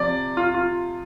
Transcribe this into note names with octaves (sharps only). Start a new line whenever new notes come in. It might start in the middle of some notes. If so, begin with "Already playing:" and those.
Already playing: C3 F3 D5
F4
F4